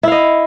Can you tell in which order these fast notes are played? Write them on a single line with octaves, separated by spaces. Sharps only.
E4 F5 D#5